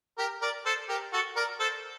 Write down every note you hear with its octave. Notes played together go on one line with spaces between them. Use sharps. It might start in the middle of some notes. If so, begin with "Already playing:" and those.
G4 A#4
A#4 D5
A4 C5
G4 A#4
F#4 A4
A#4 D5
A4 C5